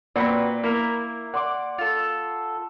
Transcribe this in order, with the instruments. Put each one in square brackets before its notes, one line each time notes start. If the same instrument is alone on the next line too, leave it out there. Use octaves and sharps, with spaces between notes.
[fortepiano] A#2 [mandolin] C4 F#4 B4 [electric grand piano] D5 B5
[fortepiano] A#3 [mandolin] E4 A#4
[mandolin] D5 [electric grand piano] F#5 C6 D6
[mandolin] F4 A4